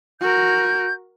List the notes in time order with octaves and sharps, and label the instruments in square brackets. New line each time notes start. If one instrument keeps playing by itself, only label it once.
[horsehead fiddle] F#4 A#4 [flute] G6